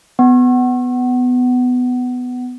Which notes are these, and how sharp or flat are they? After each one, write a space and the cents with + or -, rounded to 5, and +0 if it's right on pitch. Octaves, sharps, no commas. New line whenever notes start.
B3 +15